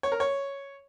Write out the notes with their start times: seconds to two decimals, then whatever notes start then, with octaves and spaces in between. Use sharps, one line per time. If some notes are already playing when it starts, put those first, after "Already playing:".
0.03 C#5
0.12 A#4
0.20 C#5